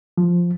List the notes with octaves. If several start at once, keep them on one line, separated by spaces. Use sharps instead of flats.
F3